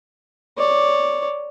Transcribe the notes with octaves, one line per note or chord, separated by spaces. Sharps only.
C#5 D5